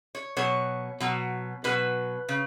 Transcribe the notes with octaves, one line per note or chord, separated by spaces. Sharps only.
C#5
B2 F#3 C#5
B2 F#3
B2 F#3 B4
C#3